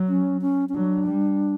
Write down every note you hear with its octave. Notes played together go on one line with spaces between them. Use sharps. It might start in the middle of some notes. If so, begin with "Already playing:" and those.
Already playing: F#3
C#4
C#4
C#4
F#3 D4
G3